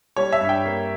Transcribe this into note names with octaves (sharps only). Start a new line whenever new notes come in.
G3 C#5
E5
G2
G5
A#3